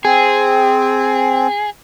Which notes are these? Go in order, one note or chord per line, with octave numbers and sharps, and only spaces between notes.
C4 G#4